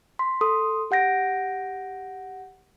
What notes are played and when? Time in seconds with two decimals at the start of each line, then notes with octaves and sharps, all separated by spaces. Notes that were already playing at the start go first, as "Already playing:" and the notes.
0.19 C6 B6
0.41 A4 C6 D#6
0.91 G4 F#5 G6 A#6 D7